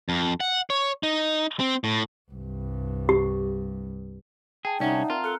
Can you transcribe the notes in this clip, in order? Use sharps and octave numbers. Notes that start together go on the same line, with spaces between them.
F2
F#5
C#5
D#4
C4
A2
C2 G2
G4
G#4 G5 A5
C2 C#4 D#4 D5 E5 F#5
A5
C4 F4 A#4 A#5
A4 F6 F#6 C#7